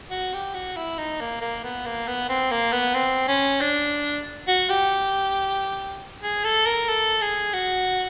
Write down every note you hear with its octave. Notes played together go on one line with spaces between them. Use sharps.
F#4
G4
F#4
E4
D#4
A#3
A#3
B3
A#3
B3
C4
A#3
B3
C4
C#4
D4
F#4
G4
G#4
A4
A#4
A4
G#4
F#4